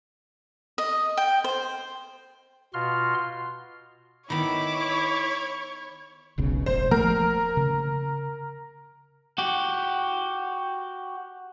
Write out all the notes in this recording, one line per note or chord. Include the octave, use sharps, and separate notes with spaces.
D#5
G5
C5
B2 F4 F#4 C6 F6
D#3 B3 E4 C#5 B5 D6
E1 B1 C#3
E1 A1 C5
F3 A3 A#3 A#4
C#3
F#4 G4